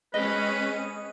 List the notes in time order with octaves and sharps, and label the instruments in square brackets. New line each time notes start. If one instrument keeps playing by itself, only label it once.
[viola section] G#3 C4 C#4 [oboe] B4 [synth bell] D#5